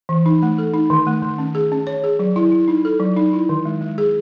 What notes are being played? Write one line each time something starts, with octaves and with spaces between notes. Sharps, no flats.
E3
D#4
A3
A4
D#4
D#3
A3
D#3
C#4
G#4
C#4
C#5
G#4
F#3
E4
E4
D#4
A4
F#3
D#4
E4
D#3
G#3
G#3
G#4